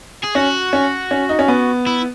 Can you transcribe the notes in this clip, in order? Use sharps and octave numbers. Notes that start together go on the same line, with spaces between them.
G#4
C#4 F#4
C#4
C#4
D#4
C#4
B3
E4